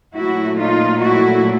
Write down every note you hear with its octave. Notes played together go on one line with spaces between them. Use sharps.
A#2 F#3 A3 E4 F#4
D#4 F4
E4 F#4